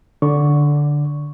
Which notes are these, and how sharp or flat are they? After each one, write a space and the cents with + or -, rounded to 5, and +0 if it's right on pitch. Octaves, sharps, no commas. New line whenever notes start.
D3 +0 D5 -20 C#6 +0